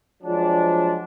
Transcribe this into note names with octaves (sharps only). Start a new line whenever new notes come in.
F3 F#3 G#3 D4